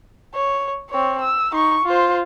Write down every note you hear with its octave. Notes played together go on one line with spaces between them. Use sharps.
C#5
C4 C#5
E6
D#4 C#6
F4 C5